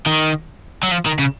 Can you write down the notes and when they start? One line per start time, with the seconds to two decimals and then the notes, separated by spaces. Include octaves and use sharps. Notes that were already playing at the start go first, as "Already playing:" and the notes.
0.06 D#3
0.83 F#3
0.91 F3
1.06 D#3
1.19 C#3